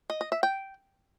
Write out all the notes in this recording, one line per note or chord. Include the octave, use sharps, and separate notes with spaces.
D#5
D#5
E5
G5